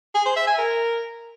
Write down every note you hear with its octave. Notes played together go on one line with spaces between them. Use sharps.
G#4
C5
E5
G#5
A#4